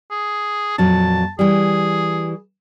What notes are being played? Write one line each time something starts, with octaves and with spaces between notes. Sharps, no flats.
G#4
F2 A#2 F#3 A5
E3 G3 G#4